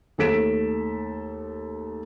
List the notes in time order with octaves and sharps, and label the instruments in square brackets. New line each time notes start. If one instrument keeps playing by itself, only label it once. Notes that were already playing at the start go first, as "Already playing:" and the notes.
[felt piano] D#2 A3 A4 B6 D7 E7